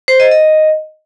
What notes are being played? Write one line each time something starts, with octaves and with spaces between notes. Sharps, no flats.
C5
D#5
D#5